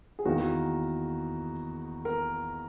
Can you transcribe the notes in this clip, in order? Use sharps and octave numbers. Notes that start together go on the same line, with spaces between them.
G#4
E2 D#3 A#3 F#4
A#4